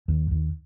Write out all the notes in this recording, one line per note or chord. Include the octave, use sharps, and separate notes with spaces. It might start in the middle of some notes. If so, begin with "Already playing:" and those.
D#2
D#2